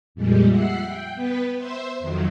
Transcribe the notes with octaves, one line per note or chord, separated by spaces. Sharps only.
F2 A#2 G3 G#3
E5 F#5 F#6 C7
G5
B3 B4
C5 E5 C6
F2 D#3 F#3